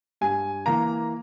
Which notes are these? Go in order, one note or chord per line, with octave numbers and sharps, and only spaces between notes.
G2 G#5
E3 A#3 A#5